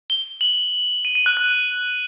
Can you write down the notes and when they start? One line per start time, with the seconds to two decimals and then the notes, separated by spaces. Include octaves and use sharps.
0.10 G7
0.41 F#7
1.05 D#7
1.15 D#7
1.26 F#6
1.37 F#6